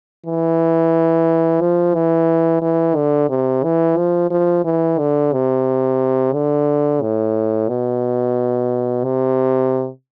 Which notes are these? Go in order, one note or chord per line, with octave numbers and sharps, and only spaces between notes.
E3
F3
E3
E3
D3
C3
E3
F3
F3
E3
D3
C3
D3
A2
B2
C3